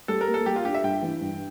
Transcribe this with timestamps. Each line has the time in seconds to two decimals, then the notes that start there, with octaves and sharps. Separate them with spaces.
0.08 G3 A4
0.21 A#4
0.28 A#3
0.34 A4
0.46 G3 G4
0.56 F4
0.65 D4 G4
0.75 E5
0.84 G2 G5
1.02 E3
1.21 G2